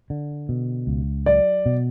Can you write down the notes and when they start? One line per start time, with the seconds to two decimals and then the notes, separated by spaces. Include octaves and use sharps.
0.10 D3
0.49 B2
0.87 C#2
1.26 F#3 D5
1.66 B2